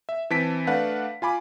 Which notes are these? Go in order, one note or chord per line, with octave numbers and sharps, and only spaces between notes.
E5
E3 C4 A5 B6 D7
A3 D4 B4 F5 F#5
F4 G#5 B5 D6